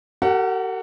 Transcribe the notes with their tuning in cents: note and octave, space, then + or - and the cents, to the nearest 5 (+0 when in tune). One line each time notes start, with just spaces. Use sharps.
G4 -45 A#4 -45 F#5 +0